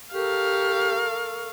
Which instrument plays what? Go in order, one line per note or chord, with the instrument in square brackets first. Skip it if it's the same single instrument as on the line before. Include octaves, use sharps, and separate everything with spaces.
[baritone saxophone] G4 [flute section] A4 A#4 C#6 [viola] F5